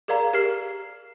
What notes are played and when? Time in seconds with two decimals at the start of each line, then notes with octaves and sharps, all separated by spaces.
0.08 G#4 A#4 D5 F5 A#5
0.33 G4 A#4 F6 C7